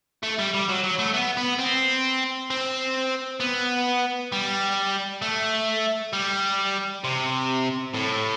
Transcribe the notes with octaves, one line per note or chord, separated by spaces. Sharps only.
A3
G3
G3
F#3
F#3
A3
B3
B3
C4
C4
B3
G3
A3
G3
C3
A2